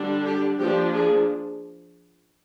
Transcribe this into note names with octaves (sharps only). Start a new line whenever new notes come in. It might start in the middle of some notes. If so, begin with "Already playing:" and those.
Already playing: D3 G3 D4
G4
F3 A#3 D4 G4
G#4